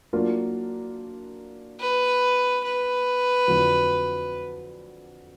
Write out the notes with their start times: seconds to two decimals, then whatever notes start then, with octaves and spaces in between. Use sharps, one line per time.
0.13 F#3 A#3 D4 F4 A#4
1.79 B4
2.64 B4
3.47 F2 D3 F#3